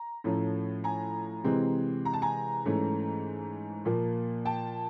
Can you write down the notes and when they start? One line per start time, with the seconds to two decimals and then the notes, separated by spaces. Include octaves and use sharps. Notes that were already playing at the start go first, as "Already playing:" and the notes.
Already playing: A#5
0.24 A2 F3 A3 C#4
0.84 G#5 A#5
1.44 C3 E3 G#3 C4
2.05 A#5
2.13 A5
2.22 G#5 A#5
2.65 G#2 E3 A3 C#4
3.85 A#2 F3 A#3
4.45 G5 A5